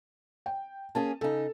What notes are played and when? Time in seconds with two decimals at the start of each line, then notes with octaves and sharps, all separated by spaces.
0.46 G5
0.95 A#3 C#4 G#4 A5
1.21 C#3 D#4 A4